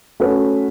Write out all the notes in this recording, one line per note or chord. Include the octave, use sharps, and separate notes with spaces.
A3 C#4 F#4 B4